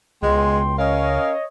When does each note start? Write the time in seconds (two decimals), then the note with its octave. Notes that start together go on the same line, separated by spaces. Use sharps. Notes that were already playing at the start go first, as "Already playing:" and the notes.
0.23 C#2 B2 G#3 G5 C6
0.78 C#4 A#4 C#5 D#5 F5